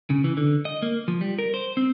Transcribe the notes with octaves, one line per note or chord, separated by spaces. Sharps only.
C#3
E3
D3
D#5
A#3
F3
G3
A#4
C5
C4